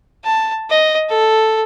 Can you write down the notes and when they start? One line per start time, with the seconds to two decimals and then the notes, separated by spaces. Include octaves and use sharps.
0.24 A5
0.70 D#5
1.09 A4